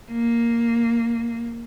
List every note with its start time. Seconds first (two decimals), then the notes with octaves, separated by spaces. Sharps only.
0.11 A#3